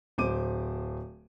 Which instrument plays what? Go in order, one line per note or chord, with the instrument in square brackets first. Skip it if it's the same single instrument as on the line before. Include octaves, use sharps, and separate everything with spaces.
[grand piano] D1 C5 D6 D#7